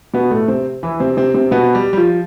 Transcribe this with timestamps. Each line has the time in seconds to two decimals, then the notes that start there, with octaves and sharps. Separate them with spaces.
0.14 B2 B3
0.31 A2 A3
0.48 C3 C4
0.83 E3 E4
1.00 C3 C4
1.17 C3 C4
1.34 C3 C4
1.51 B2 B3
1.75 G3
1.93 G3
1.97 F3